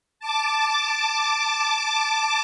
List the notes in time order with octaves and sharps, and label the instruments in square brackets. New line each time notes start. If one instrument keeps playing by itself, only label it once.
[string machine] A5 D6